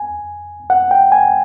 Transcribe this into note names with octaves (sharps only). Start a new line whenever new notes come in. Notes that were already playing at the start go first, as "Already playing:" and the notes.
Already playing: G#5
F#5
G5
G#5